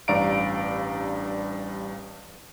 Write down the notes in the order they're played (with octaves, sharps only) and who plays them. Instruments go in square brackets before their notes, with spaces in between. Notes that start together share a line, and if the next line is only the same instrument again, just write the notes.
[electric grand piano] A1 G2 D5 F5 A#5 D7